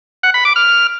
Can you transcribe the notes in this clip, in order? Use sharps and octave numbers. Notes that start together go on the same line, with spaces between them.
F#5
B5
D6
F6